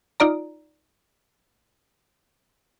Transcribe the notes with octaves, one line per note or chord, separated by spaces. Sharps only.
D#4 F4 D5 A#5